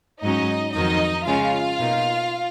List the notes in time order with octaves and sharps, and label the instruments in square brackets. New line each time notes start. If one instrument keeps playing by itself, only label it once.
[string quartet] G#2 F#3 C#4 [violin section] D#4 D#5
[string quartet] F2 D#3 F#3 [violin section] D#4 D#5
[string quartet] C#3 G#3 C#4 [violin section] F4 F5
[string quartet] B2 A#3 D#4